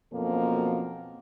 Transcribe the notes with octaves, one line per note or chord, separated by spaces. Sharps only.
F#2 B2 F3 A#3 C4 A4